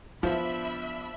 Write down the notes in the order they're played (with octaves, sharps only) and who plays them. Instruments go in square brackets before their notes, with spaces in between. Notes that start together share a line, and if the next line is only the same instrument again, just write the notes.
[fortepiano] F3 [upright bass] B3 [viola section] D4 E5 B5